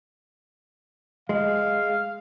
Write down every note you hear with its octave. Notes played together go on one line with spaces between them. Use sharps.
G#3 F5